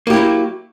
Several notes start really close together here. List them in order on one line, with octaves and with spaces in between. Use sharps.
A#3 G4 E4 F#3